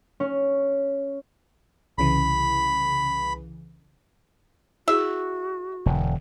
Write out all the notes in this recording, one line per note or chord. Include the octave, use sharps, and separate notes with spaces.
C#4
C2 C#3 E3 B5
E4 F#4 G#4 E5
E1 E2 D3